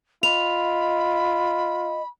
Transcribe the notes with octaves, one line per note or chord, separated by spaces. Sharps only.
F4 D#5 B5 F7